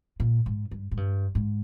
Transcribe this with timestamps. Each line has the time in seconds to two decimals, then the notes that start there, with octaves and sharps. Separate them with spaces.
0.20 A#2
0.46 G#2
0.71 G2
0.91 G#2
0.97 G2
1.35 G#2